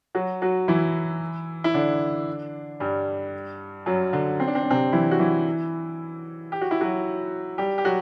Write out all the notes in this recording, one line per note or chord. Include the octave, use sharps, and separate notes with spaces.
F#3 F#4
F#3 F#4
E3 E4
E4
D3 D4
G2 G3
F#2 F#3
D3
C4
D4
C4
D4
C3 C4
E3 E4
F#4
E3 E4
G4
F#4
E4
F#3 F#4
G3 G4
G4
F#3 F#4